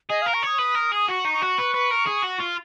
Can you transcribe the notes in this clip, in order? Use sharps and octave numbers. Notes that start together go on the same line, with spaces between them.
G#4 D#5
A#4 F5
C#6
C#5 D#6
B4
A#4
G#4 D#6
F#4 C#6
D#4
C#6
F#4
B4
B4
A#4
G#4
F#4
F4